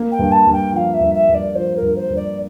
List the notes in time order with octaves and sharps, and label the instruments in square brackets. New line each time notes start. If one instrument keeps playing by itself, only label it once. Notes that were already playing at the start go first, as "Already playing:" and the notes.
Already playing: [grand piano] A#3
[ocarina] G5
[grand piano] G2
[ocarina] A5
[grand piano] G2
[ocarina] G5
[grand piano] F3 [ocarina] F5 G5
[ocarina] E5
[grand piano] G2
[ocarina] E5
[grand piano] G2
[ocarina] D5
[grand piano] F3 [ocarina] C5
[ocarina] A#4
[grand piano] G2
[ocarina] C5
[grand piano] G2
[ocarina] D5